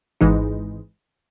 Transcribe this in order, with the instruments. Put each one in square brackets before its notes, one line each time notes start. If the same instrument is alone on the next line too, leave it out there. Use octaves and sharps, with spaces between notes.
[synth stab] G#1 G#2 E3 G#3 D#4